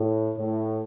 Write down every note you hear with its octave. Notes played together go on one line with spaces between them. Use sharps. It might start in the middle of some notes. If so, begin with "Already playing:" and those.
Already playing: A2
A2